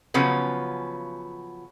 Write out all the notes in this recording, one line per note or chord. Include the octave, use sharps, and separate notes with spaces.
C#3 F3 F#3 B3 C#4